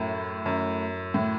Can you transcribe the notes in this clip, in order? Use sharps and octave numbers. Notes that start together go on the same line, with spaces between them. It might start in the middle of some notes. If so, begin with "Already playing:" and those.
Already playing: F#2 A2
F#2
A2